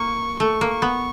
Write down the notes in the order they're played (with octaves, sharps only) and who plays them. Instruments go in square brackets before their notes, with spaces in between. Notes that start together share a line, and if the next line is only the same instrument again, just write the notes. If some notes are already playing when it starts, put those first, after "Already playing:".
Already playing: [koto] A#3 [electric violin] C#6
[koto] A3 [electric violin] C#6
[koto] A#3
[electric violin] C#6
[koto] B3